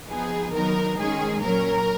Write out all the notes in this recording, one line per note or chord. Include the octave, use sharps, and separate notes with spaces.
F3 B3 D#4 G#4
D#3 F#3 B3 D#4 A#4
D#3 G#3 C#4 G#4
A#2 F#3 C#4 A#4